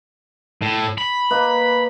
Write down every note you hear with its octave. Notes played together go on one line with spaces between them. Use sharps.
A2
B5
A#3 B4 D#5